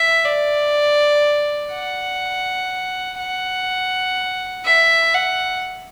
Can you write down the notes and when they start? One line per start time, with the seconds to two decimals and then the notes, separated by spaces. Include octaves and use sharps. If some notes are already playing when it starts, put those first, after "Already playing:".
Already playing: E5
0.25 D5
1.72 F#5
3.19 F#5
4.65 E5
5.14 F#5